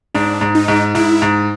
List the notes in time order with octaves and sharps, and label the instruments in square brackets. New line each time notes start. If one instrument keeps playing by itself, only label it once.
[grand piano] G#2 [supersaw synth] D4
[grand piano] G#2
[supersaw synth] D#4
[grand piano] G#2
[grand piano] G#2 [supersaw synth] E4
[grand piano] G#2